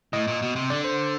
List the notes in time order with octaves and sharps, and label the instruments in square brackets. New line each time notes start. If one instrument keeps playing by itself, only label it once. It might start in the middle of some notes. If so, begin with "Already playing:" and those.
[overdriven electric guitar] A2 [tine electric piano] D#5
[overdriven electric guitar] A#2
B2
C3
[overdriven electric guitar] D3 [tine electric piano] D5
[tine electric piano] C5